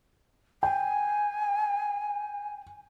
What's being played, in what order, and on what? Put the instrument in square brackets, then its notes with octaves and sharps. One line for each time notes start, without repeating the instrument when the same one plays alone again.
[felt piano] G5 [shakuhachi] G#5